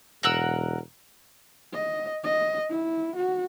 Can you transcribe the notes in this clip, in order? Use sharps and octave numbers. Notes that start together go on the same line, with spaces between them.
E1 A#4 F#5 E6
D#5
D#5
E4
F#4